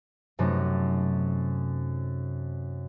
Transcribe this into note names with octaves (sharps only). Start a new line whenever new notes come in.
F#2 C3 F#3 A3 D#4